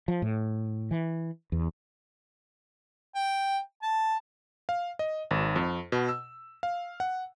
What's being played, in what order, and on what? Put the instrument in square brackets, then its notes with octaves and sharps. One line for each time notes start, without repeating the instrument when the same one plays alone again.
[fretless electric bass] F3
A2
E3
E2
[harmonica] G5
A5
[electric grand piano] F5
D#5
G#1
F2
B2
E6
F5
F#5